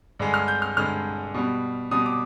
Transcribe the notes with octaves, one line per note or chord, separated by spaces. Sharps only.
G2 D3 G#3
F6
G6
F6
G2 D3 G#3 F6
B2 G3
B2 G3 D#6
D6